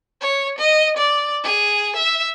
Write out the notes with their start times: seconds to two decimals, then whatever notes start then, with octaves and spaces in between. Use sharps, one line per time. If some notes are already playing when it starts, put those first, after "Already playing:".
0.21 C#5
0.59 D#5
0.97 D5
1.44 G#4
1.96 E5